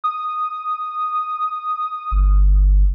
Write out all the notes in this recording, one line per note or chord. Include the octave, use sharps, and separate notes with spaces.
D#6
G1